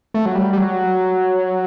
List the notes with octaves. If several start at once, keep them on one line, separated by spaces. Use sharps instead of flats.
A3
F#3
G3
G3
F#3